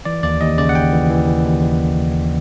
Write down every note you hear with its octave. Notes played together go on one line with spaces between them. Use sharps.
E3 D5
D#2 D5
D#2 D#5
C#3 D5
F#5
D#2 G5
E3
E3
E3
D#2
E3